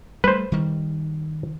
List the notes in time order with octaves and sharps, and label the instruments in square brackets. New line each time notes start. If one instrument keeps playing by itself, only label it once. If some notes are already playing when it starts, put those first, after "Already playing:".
[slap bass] G3 A3 [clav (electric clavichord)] B4 C5
[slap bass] D#3 G3